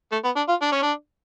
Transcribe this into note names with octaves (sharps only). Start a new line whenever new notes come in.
A3
B3
D4
F4
D4
C#4
D4